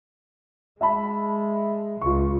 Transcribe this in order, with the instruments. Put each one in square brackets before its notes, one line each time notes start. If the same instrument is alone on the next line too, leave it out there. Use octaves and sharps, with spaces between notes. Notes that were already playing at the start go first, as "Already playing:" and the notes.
[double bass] G#3 [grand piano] E5 A5 B5
[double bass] C#2 [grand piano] F4 C#6